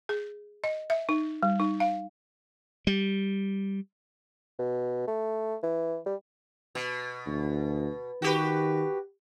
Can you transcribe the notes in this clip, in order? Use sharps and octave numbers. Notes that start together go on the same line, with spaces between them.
G#4
D#5
E5
D#4
G3
D#4
F5
G3
B2
A3
E3
G3
B2
D2
D#3 F#4 G4 B4